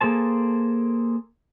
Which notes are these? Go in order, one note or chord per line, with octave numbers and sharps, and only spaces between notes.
A#3 G#4 A4 C5 A5